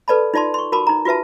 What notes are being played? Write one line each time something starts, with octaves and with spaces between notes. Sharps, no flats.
A4 B4 D5 A5 B5
D#4 F4 D5 A5 C6
C6 C#6
F#4 A#4 A5 B5 D6
D#4 A#5
F4 F#4 B4 E5 A5